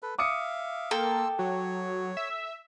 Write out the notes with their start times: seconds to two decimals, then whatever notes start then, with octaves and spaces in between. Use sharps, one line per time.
0.02 A4 B4
0.19 E5 F5 D6 D#6 C#7
0.91 A#3 A4 G5 A5 C6 E6
1.39 F#3 C#5
2.17 E5